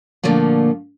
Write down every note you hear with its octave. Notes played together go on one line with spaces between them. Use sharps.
A#2 D3 F3 A3 A#3